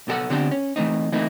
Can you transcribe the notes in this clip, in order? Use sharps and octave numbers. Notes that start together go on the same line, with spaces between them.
B1 B2 G4 A4 F#5
D3 B3 C4 D4 G4 C5
C#4
E3 A3 C4 D#4
E3 A3 A#3 C4 D#4 E4